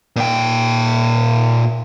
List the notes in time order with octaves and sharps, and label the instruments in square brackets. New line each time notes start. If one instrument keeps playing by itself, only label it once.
[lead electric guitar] A#2 G5